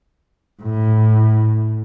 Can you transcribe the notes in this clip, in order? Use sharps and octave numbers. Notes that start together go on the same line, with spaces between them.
A2